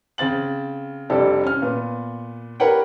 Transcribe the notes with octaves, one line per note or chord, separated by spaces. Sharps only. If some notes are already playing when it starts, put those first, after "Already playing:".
C#3 C4 A6 F#7
F1 F2 G3 D4 G4 A4
C#4 F6
A#2 B3
G4 A#4 B4 C#5 F#5 G5